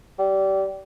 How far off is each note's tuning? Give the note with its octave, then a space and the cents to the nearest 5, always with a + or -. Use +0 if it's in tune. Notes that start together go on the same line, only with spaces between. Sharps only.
G3 -25